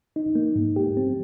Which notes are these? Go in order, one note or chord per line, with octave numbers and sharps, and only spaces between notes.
D#4
A#3
G#2
G4
C4